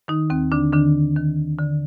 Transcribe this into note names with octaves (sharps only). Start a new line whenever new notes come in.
D#3 D#4
D#2 C4
D3 D4
D3 D#3 D4
D#3
D3